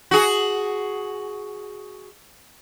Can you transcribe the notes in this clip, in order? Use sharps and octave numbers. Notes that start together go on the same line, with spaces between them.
F#4 G#4